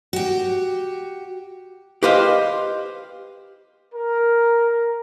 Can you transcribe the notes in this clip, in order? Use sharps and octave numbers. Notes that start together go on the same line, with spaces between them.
F#4 G4
G4 B4 C5 D#5 F5
A#4